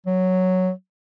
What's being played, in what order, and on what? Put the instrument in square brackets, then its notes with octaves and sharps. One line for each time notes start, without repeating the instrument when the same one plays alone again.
[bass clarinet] F#3